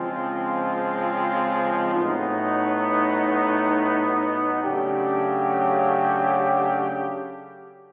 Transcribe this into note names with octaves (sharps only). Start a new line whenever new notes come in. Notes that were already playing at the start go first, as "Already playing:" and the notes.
Already playing: C#3 F3 G#3 C4 F4
A2 F#3 B3 D#4
C#3 F#3 A3 D4 G4